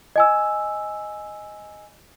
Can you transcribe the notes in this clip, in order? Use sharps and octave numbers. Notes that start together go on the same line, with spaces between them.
D#5 G#5 E6